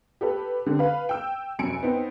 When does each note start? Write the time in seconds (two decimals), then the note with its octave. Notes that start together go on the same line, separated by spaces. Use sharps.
0.21 G4 A4 B4
0.66 D3 C4
0.79 B4 F5
1.09 G5 E6
1.59 F1 F#2 G#5 C#7 D7
1.83 B3 C4 D#4